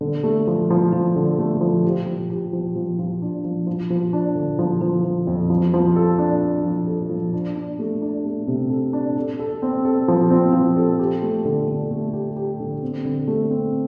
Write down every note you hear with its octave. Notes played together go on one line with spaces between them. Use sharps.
D3
A3
F3
F3
F3
D3
A3
F3
G4
F3
G4
F3
F3
F3
D4
F3
F3
F3
D4
D3
F3
F3
F3
F2
F3
F3
A4
D4
D4
F3
A4
F3
D4
D4
A3
D4
A3
C3
A4
D4
A4
A4
C4
A4
F3
C4
F3
A4
G4
A3
D3
D3
A3
G4
G4
D3
C4
D3
A3
C4